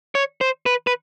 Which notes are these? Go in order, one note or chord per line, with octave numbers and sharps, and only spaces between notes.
C#5
C5
B4
B4